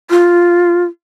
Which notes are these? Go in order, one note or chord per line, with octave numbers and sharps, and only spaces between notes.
F4